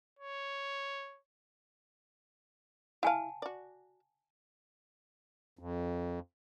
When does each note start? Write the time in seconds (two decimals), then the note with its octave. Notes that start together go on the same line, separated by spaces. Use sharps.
0.19 C#5
3.03 E4 F5 F#5 G#5 A5
3.42 F#4 D5
5.59 F2